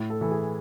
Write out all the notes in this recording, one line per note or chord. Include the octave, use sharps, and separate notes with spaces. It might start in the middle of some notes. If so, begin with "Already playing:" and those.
Already playing: A2
A4
E3 A4
G#4